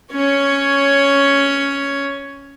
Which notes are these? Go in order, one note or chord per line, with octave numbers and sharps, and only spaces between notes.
C#4 C#5